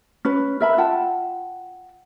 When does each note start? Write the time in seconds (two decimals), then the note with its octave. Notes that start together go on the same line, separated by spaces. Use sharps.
0.25 C#4 B4
0.60 A#4 E5 B5
0.78 F4 F#5 G5 A5